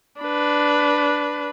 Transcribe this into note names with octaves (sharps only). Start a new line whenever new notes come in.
D4 B4